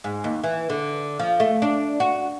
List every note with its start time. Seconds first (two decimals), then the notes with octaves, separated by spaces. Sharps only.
0.04 G#2
0.24 D#2
0.44 E3
0.70 D3
1.19 F3
1.40 A3
1.62 D4
2.00 F#4